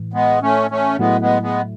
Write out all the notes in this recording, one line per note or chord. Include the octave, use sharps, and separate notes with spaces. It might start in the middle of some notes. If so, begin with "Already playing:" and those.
Already playing: A2 E3
G#3 B3
A3 C#4
A3 C#4
A2 F#3 G#3 A3 B3 E4
G#3 B3
G#3 B3